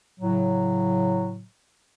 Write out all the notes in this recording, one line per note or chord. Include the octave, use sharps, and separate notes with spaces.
A2 C#3 F#3